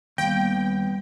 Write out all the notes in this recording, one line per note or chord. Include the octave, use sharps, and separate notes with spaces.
D#2 G3 B3 G5